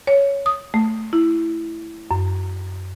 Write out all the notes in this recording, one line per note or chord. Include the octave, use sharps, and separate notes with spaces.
C#5
D#6
A3
E4
F#2